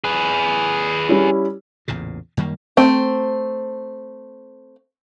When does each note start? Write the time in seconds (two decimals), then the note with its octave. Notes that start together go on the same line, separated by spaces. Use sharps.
0.04 G#4 B4
1.09 G3 C#4 E4
1.88 A1 E2 A#2 C#3
2.37 F#2 D#3 G3 A#3
2.77 A3 C4